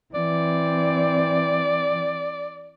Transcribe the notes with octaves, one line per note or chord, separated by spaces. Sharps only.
E3 C4 D5